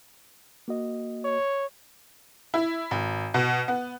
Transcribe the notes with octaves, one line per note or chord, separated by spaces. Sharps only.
A#3 F#4 D#5
C#5
E4
G#1
B2
B3